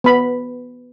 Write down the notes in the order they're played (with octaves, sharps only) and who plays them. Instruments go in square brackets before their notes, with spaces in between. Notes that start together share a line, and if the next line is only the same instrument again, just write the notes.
[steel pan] B3 B5